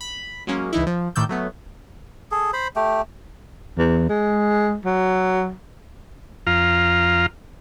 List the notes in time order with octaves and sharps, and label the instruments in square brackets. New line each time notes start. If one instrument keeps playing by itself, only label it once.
[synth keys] B5
F#3 G#3 A#3 C#4
C#2 E3 D#4 E4
F3
A2 D#3 D5 E6 G6
F#3 A3 B3
[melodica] G#4 A4
C5 B5
A3 G4
[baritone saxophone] E2
G#3
F#3
[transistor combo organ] F2 F4 F5 A#5